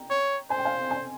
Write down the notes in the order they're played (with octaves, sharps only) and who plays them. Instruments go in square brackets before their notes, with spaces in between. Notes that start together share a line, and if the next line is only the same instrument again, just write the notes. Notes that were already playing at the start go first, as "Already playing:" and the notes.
Already playing: [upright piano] G5 A#5
[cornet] C#5
[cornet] C5 [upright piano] G#5
[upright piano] G5
F5 G#5
G#5 C6